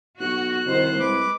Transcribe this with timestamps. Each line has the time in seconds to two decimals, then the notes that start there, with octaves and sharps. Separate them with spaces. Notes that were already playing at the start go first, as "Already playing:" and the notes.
0.20 B1 F#4 F#6
0.66 C2 D#3 C5
0.99 G#3 B4 D6